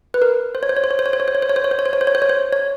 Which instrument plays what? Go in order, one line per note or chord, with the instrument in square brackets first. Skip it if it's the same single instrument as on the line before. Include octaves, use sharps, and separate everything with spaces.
[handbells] B4
A#4
C5
C#5
C5
C#5
C5
C#5
C5
C#5
C5
C#5
C5
C#5
C5
C#5
C5
C#5
C5
C#5
C5
C#5
C5
C#5
C5
C#5
C5
C#5